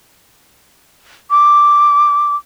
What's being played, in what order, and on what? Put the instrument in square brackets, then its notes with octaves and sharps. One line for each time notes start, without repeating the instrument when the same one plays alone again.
[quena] D6